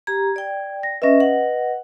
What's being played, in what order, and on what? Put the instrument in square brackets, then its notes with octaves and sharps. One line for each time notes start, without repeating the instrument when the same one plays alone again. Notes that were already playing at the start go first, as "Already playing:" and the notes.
[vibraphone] G4 A#5 [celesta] G#6
[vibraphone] D5 G5
[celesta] A#6
[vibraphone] C#4 E5 [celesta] B4 D#5 A#6
[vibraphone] F#5